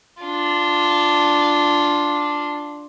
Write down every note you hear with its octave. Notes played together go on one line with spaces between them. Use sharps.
D4 F4